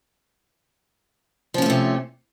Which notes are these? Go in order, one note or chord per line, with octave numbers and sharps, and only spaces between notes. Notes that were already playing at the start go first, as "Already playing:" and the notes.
C3 F3 A3 A#3 C#4